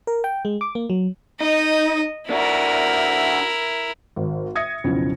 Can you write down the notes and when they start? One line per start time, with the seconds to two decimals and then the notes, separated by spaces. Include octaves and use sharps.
0.07 A#4
0.24 G5
0.45 G#3
0.61 D6
0.75 A#3
0.90 F#3
1.41 D#4 D#5
2.30 D4 E4 F#4 A#4
4.16 G#1
4.55 E5 D#6 G#6 A#6 C#7
4.84 B1 F2 C#3 E4